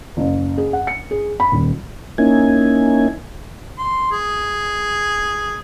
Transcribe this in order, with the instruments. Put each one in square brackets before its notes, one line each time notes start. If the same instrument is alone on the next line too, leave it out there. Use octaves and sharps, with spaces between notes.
[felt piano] F#1
G#4
F#5
C#7
G#4
B5
D#1
[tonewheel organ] A#3 C#4 D#4 E4 G#5
[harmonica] C6
G#4